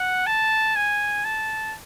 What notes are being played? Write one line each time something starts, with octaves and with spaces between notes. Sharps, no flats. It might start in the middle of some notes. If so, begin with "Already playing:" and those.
Already playing: F#5
A5
G#5
A5